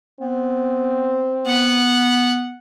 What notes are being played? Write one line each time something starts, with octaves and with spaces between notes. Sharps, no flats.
B3 C4
B3 F#5